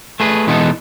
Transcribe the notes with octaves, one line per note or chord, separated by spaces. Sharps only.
A3 G#4 B4
B2 E3 G#3 B3 D#4 A4